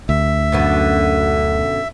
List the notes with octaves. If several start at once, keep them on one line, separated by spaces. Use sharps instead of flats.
D2 E5
F#2 B2 D3